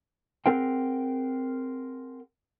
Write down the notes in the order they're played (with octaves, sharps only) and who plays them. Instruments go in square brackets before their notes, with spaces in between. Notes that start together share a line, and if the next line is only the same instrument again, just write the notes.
[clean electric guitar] C4 G#4 A#4 C5 F#5 G5